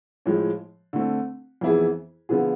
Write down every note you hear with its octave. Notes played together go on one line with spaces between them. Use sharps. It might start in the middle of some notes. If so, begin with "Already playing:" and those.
A2 F3 G#3
D3 A3 C4
F2 E3 B3 E4 G#4
D3 F3 B3 F4 G#4